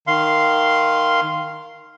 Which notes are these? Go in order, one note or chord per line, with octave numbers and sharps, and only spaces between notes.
D#3 F5 C6